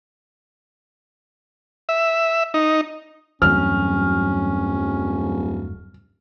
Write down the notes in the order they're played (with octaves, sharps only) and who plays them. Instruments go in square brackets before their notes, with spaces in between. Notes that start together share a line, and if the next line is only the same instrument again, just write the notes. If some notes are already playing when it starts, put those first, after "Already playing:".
[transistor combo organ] E5
D#4
[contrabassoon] D1 [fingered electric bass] E2 G2 F#3 [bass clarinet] C#4 [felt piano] F6